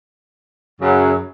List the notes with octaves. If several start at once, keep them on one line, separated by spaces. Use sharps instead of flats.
F#2 C#3 F#3